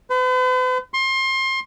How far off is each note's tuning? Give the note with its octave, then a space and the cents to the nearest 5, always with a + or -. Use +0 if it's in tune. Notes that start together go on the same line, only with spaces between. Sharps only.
B4 +45
C6 +30